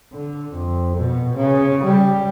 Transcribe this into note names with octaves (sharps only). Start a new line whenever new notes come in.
D3
F2
B2
C#3
G3